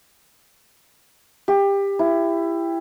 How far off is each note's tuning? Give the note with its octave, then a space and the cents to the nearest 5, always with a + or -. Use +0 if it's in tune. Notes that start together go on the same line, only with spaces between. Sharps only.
G4 +20
E4 +20